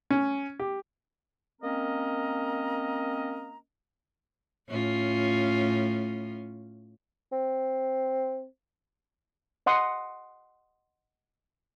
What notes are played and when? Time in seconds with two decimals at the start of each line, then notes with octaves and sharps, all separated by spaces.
0.11 C#4
0.59 G4
1.62 A#3 C4 C#4 A#4 D#5 A#5
4.68 A2 C#4 F4
7.32 C4
9.66 D#5 F#5 C6 D#6